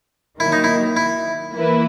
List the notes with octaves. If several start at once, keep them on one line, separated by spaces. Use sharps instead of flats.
D#3 F#3 A#3 E4
D#4
E4
E4
E3 A#3 E4 B4